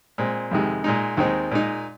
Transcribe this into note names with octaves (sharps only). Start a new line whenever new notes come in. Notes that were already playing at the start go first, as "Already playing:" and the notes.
A#2 G#3 C4
F2 C3 D#3 G#3
A#2 G#3 D#4
D#2 D#3 G#3 C4 D#4
A#2 G#3 D#4